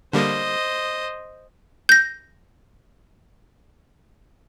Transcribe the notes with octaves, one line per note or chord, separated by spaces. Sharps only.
D3 G3 A#3 C5 D#5
G6 A#6